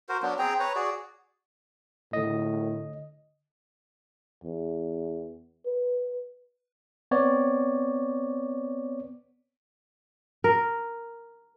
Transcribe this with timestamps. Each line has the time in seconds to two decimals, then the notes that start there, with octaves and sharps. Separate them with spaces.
0.09 F#4 A#4 C5
0.23 F#3 B3 D4
0.39 C4 G#4 G5 A#5
0.60 B4 C#5 A#5
0.75 F#4 G#4 D5
2.13 A2 D3 D#5
4.44 E2
5.66 B4
7.11 B3 C4 C#5 D5
10.44 A#4